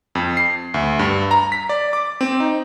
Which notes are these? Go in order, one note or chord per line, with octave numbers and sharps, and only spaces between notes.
F2
C7
D2
G2
A#5
B6
D5
D6
C4
D#4